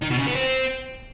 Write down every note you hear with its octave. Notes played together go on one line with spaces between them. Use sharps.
D#3
B2
C#3
B3
C4